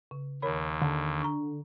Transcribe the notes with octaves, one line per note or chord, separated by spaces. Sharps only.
C#3
D#2 A#4 C#5 B5
D3 A5
A#5 C#6